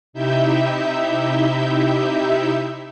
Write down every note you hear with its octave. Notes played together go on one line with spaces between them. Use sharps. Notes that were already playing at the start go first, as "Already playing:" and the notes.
C3 D#4 E4 G4 E5 G6